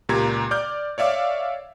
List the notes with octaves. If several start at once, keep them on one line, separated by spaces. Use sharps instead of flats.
C#2 A#2 G4 A#5 G#6
D5 D6 F6 G6
C#5 D5 E5 F5 D6